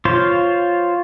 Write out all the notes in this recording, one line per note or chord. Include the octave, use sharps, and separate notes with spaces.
F4 C5 C#5